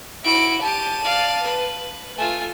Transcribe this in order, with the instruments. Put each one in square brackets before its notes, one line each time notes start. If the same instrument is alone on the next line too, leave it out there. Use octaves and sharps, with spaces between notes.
[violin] E4 D7 [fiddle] F#4
[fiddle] G4 [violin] A5 D#7
[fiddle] D5 F5
B4
[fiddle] A3 F4 [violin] G#5